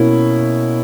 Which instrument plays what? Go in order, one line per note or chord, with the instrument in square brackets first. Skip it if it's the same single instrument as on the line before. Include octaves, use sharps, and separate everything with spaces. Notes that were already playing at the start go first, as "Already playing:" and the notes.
Already playing: [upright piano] B2 A#3 C#4 E4